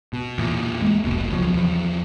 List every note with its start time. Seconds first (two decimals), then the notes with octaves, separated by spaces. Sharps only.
0.13 B2
0.38 E2 A#2
0.82 G#3 A#3
1.03 F1 C#2 B2
1.32 C#2 F3 F#3
1.51 E2 F3